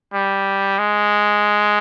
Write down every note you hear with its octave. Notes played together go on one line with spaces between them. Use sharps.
G3
G#3